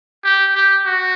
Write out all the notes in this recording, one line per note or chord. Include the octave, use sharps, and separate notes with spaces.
G4
G4
F#4